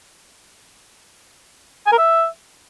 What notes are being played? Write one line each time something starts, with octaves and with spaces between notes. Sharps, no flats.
G#5
A#4
E5